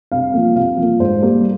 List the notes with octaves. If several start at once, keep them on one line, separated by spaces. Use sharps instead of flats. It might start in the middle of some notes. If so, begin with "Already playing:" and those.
C3 F5
F3 A#3
C3 F5
F3 A#3
G#2 C5
G3 A#3